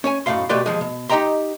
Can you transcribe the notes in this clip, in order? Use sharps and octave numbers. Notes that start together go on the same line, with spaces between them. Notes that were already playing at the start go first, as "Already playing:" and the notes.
C#4 C#5 G#5
B1 F#2 A2 A3 F5 C6
B2 A3 G4 B4 D5 C6
D#2 F3 G#3
B2
D#4 G4 D#5 G5 A#5 C6